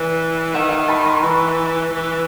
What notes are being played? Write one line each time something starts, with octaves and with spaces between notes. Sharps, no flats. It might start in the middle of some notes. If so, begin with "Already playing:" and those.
Already playing: E3 D5
D#3 E5 F#5
E5 F#5
A5 B5
A#5 C6 C#6
E3 B5 C#6
E3